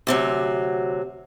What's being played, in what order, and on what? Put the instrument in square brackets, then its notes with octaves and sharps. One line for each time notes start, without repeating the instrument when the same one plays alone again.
[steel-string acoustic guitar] D2 C3 F#3